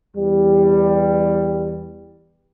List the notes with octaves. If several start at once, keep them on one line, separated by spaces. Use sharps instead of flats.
E2 G3